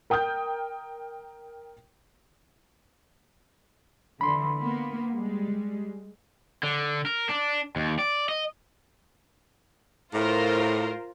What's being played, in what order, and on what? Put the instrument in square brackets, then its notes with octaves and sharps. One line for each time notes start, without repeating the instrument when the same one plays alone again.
[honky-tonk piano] A#4 G5 D#6 F6 G6
[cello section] D3 E3 [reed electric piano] B5 C6
[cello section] A#3 B3
G3 G#3
[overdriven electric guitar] D3
A#4
D4
D#2
D5
D#5
[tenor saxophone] A2 [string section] F4 A#4 C5